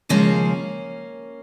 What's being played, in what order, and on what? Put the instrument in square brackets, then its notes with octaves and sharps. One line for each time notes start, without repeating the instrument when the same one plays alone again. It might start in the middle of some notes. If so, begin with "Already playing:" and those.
[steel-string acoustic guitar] D#2 C#3 F3 G#3 A#3 C#4